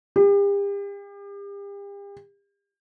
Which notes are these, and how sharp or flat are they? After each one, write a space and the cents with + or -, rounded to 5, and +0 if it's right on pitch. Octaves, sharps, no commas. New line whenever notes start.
G4 +40